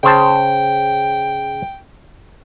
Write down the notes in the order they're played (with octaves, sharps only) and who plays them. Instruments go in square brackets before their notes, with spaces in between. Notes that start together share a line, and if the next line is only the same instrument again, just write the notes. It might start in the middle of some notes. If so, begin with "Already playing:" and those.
[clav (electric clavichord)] C#3 C5 A5 [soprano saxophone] G5